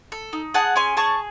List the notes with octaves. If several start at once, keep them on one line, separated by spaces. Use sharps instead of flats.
A4
D#4
G#4 F#5 A5
C#4 G#5 C6
G#4 A5 C#6